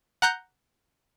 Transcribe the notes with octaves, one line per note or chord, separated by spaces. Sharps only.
F#5 A#5 F#6 G6